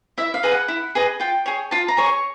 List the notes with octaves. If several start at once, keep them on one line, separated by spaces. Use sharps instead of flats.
E4 E5
F5
G#4 B4 D#5
F#5
E4
G#4 B4 D#5
F4 G5
G#4 C#5
F4 A5
A#5
G#4 C#5
C#6